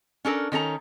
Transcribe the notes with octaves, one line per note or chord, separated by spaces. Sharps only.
C#4 D4 A4 A#4
D#3 C#4 A4 A#5